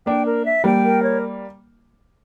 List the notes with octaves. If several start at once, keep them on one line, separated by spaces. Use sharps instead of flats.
A#3 D4 G5
A#4
E5
G3 A#3 G5
A#4
C#5